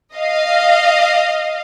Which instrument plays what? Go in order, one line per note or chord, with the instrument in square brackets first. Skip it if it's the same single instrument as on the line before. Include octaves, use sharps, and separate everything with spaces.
[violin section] D#5 F5